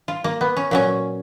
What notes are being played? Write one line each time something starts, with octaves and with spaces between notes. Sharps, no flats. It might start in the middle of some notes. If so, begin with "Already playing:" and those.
F4
A#3
B3
C#4
A#2 F#3 C#4